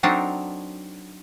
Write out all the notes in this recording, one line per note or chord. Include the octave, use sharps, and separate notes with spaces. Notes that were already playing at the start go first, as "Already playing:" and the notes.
F#3 C4 D4 D#4 A4 A#4